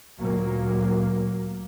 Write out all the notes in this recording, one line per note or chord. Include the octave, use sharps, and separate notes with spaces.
D2 A#2 F#3 A#3